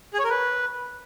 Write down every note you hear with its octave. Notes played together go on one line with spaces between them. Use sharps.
G#4
C#5
A#4
B4